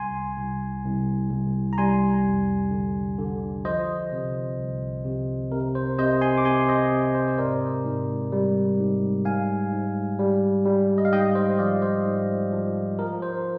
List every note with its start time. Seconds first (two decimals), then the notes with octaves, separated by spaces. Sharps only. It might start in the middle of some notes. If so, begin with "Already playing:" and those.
Already playing: C2 G#5 C6
0.38 C2
0.84 C2
1.31 C2
1.73 A#5
1.78 G3 G#5 C6
2.25 F2
2.71 D3
3.19 D3
3.65 F3 C5 D#5
4.12 C3
4.59 C2
5.05 C3
5.51 C3 A#4
5.75 C5
5.98 C3 C5 D#5
6.21 G#5 C6
6.38 D6
6.45 C3 G#5 C6
6.68 C5 D#5
6.92 C3
7.15 C5
7.28 C5
7.38 G#2 A#4 D5
7.85 G#2
8.32 G3
8.79 G#2
9.25 G#2 F5 G#5
9.72 G#2
10.19 G3
10.65 G3
10.98 D#5
11.05 F5
11.12 G#2 D#5 G5
11.35 C5 D#5
11.58 F3 D5 F5
11.82 C5 D#5
12.05 G#2
12.52 F3
12.99 F3 A#4
13.22 C5